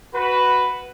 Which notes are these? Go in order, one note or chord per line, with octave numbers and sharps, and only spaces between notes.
F#4 B4